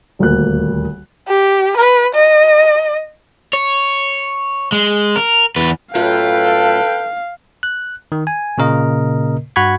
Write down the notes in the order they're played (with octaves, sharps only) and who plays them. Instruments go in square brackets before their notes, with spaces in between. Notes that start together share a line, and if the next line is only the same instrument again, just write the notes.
[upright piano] D#1 D2 A#3 F#6
[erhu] G4
B4
D#5
[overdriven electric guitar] C#5
G#3
A#4
E2 B4
[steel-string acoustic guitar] F#2 A2 F4 [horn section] A4 B4 G5 [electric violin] F5
[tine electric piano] F#6
D#3
G#5
A#2 C#3 A#3 A#4 D#5
G2 F#4 F#5 B5 C#6 G#6